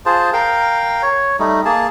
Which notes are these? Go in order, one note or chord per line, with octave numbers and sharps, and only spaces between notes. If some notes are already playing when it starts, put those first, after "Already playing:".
F4 G#4 C5 A5
A#4 F5 G5
C#5
G3 A3 D#4
A#3 G#4 A5